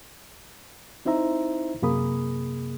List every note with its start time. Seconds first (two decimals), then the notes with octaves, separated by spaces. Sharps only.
1.05 C4 D#4 E4 C5 E5 A#5
1.82 F#2 C3 A#3 G#4 B5 D#6